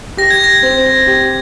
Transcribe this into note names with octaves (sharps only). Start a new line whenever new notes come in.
G4 A#6
G#6
A#6
C4
G4